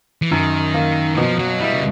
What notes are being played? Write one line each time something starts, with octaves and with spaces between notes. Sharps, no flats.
E3
F#2 D#3
A#3
E3
B2 F3
F#3
G3 E4
C#3